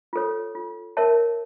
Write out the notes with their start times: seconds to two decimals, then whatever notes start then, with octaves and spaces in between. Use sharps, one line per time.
0.13 F4 A4 C#5
0.55 F4
0.97 A#4 C#5 E5 A5